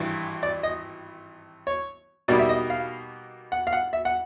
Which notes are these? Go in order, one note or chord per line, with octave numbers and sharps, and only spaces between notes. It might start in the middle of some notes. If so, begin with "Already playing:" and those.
Already playing: G#1 G2 E3
D5
D#5
C#5
B2 G3 A#3 D#4 D5
E5
D#5
F5
F#5
F5
F#5
E5
F#5